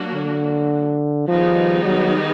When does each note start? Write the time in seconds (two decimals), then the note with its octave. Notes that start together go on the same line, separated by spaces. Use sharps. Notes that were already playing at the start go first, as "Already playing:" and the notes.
Already playing: F#3 A#3 D4 F#4
0.13 D3
1.28 D#3 F3 G3 B3 D#4 G#4
1.85 F#3